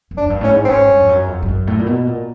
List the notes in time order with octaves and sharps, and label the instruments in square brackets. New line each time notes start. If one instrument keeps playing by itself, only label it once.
[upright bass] F#2
[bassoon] D4
[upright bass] F#2
G2
[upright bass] A2 [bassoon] C#4
[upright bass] G#2
[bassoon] C4
[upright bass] G#2 [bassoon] C#4
[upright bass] G2
F2
F#2
F2
G2
F#2
A2
A#2
B2
A#2